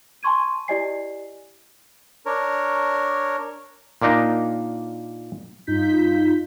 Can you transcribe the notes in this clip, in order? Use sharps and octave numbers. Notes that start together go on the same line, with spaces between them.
G#5 A5 C6 C#6 G#6 D#7
E4 G4 D5 D#5 G#5 C7
D4 A#4 C#5
A#2 A#3 D4 D#4 D#5
G2 D#4 F4 G6 B6